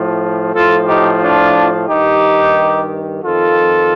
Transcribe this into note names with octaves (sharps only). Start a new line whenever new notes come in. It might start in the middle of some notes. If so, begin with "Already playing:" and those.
Already playing: A2 F3
A2 F3 F4 A4
D#4 G4
D4 F4
G2 D#3 D#4 G4
F2 D#3 F4 A4